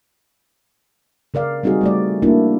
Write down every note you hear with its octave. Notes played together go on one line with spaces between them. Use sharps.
C#3 A#4 D5 F5
G3 C4 D#4 F#4 G#4
G3 A3 D5
A3 A#3 D4 E4 F#4